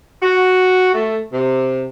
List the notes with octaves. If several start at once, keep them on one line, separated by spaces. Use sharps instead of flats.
F#4
A3
C3